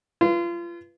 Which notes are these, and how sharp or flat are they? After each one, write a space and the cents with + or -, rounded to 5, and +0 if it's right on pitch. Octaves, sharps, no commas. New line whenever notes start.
F4 -30 B4 +0